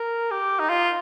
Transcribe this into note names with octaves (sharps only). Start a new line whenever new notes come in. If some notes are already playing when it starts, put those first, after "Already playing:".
Already playing: A#4
G4
D#4
F4